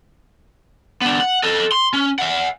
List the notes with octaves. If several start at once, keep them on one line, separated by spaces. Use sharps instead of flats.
B3 D4
F#5
A4 D#5
C6
C#4
E5 F#5